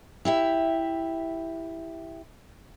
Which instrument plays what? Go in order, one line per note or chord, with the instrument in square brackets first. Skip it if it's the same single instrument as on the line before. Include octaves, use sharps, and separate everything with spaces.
[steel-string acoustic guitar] E4 G4 E5